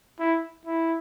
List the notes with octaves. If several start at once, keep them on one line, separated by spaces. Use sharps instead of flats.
E4
E4